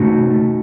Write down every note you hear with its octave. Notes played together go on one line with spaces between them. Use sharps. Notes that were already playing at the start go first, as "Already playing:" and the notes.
Already playing: C3 A3 D#4 F#4
A3